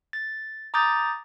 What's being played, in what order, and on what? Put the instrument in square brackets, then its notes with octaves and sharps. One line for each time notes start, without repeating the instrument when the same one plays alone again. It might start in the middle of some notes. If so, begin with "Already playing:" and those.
[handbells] A6
A#5 D6 D#6 G6 A6